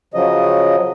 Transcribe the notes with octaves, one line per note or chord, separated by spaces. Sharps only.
C#3 F3 F#3 D#5